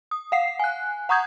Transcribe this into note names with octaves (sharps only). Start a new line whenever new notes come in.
D#6
F5 F#5 C7
G#5 F#6
F#5 A#5 C#6 D#6 G6 G#6